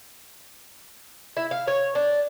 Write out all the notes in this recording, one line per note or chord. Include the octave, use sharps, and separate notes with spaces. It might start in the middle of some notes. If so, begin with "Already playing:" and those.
E4
F5
C#5
D4